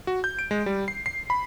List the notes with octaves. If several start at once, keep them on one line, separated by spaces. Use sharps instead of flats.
F#4
G6
D7
G#3
G3
C7
C7
B5